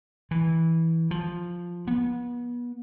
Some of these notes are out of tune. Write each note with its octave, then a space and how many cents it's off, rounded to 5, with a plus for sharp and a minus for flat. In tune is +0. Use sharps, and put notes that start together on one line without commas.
E3 -10
F3 +0
B3 -30